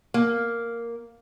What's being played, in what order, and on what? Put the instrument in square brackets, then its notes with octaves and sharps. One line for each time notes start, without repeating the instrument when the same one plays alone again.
[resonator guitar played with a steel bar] A#3